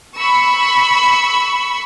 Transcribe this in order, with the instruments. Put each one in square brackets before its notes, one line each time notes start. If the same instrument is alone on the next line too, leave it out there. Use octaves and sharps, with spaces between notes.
[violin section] B5 C#6 E6